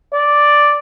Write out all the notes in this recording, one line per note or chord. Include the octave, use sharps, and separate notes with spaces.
D5